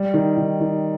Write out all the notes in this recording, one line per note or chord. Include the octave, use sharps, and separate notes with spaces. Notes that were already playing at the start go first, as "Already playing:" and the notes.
Already playing: G3
D#3
D#3
D#3